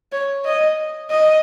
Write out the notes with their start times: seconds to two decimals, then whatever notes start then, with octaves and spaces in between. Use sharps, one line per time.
0.12 C#5
0.45 D#5
1.10 D#5